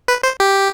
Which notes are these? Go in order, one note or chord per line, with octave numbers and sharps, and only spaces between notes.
B4
C5
G4